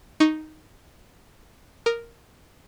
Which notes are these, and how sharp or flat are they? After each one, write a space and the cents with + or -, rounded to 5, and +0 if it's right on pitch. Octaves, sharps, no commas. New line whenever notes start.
D#4 +0 C#6 +0
A#4 +0 D#6 -25